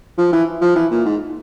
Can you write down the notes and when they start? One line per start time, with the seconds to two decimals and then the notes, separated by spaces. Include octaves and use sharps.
0.18 F3
0.33 E3
0.61 F3
0.76 E3
0.91 A#2
1.05 G#2